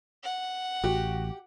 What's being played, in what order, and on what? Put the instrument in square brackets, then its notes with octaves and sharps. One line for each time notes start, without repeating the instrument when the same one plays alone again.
[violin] F#5
[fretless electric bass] A1 [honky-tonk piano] F#4 [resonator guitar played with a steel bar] G4